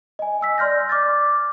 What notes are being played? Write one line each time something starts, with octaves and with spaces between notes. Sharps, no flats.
D#5 G#5
G#5 E6 B6
D5 C6 F6 G6 A#6
D6 F6 A6